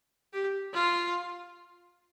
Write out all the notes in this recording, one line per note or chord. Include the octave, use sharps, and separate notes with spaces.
G4
F4